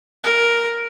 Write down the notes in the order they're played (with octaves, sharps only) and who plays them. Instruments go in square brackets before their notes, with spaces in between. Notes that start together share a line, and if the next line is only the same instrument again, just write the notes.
[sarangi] A#4